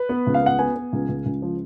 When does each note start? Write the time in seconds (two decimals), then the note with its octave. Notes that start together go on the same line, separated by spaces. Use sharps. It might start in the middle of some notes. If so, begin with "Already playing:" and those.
Already playing: B4
0.09 B3
0.27 C#2
0.34 F5
0.42 B3 F#5
0.59 B3 G#5
0.76 B3
0.93 C#2
1.09 C#2
1.26 C#2
1.42 F3